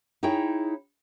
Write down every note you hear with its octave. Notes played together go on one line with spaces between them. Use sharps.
D#4 E4 G#4 C#5 G5